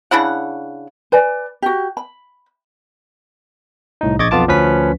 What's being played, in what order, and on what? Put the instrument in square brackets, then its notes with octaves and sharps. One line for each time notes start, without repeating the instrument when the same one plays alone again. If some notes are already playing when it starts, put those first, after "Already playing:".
[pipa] C#3 D4 E4 F#5
[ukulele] B4 D5 G#5
F#4 G4
B5
[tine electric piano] C2 A2 D#4
A#1 D#5 C#6 D6 G#6 A6
B1 F2 B3 F4 A5 D6
D2 F3 C#4 B4 B6